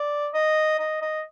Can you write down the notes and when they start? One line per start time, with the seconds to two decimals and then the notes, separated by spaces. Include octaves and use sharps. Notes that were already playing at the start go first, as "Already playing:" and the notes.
Already playing: D5
0.34 D#5
0.79 D#5
1.02 D#5